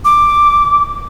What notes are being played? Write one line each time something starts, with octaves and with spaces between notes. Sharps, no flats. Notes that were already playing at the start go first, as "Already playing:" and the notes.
D6